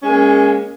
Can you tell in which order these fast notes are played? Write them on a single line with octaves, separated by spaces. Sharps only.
C#4 G#3 A#3